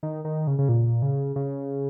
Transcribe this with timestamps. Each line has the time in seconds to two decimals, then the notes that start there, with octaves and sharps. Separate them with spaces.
0.03 D#3
0.25 D#3
0.47 C#3
0.59 C#3
0.69 A#2
1.02 C#3
1.36 C#3